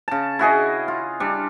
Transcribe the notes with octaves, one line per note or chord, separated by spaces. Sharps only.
C#3 A5
E4 F#4 G#4 D#5
F4
G3 D4